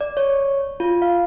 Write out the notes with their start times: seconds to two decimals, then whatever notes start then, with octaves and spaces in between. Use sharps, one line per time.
0.01 D5
0.17 C#5
0.80 F4
1.02 F5